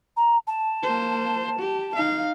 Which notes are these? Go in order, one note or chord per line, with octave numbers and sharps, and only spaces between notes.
A#5
A5
A#3 C5
G4
D#4 F5